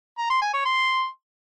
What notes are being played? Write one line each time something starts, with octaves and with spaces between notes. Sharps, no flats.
A#5
C6
G#5
C#5
C6